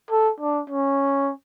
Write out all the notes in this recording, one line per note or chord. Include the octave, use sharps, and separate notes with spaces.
A4
D4
C#4